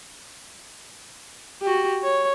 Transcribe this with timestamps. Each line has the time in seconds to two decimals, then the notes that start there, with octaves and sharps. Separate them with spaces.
1.62 F#4 G4
2.03 C#5